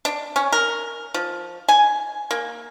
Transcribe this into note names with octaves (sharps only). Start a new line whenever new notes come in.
D4
C#4
A#4
F3
G#5
A#3